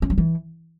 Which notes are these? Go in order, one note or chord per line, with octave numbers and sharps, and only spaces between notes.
C#4
F#3
E3